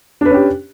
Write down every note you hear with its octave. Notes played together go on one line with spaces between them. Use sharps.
C#4 D4 G4 B4